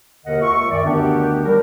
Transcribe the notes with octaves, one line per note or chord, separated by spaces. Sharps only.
D#2 B2 D3 A#4 D#5 F#5
C#2 F4 E5 C#6
F#2 D#3 D5
D2 D3 D#3 B3 D4 G4
F#3 G3 A#4